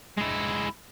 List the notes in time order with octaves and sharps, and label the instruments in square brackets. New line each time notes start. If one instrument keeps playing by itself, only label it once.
[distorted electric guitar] G#3 E4